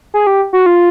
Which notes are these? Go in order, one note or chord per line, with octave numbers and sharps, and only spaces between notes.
G#4
G4
F#4
F4